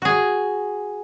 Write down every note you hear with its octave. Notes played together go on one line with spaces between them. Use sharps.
F#4 G#4